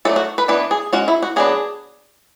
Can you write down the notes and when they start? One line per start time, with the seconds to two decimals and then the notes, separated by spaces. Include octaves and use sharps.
0.05 F#3 A3 D4 A4
0.16 F#4
0.38 B4
0.48 E3 B3 D4 B4
0.71 G#4
0.93 G#3 C#4 F#4
1.08 E4
1.22 F#4
1.36 F#3 B3 D4 G#4